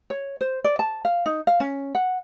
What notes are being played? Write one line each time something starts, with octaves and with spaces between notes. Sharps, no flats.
C#5
C5
D5
A5
F5
D#4
F5
C#4
F#5